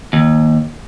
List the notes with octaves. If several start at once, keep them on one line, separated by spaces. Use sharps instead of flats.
D#2